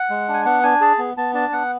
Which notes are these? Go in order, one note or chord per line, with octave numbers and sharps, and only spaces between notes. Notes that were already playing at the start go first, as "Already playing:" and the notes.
Already playing: F#5
G#3
D4
G#5
B3 F#5
D4 G#5
G#4 A5
B3
B3 A5
D4 A5
B3 F#5